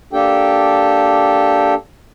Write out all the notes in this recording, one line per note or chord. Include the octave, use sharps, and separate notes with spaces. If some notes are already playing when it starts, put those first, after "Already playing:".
A#3 D4 G4 A4 G5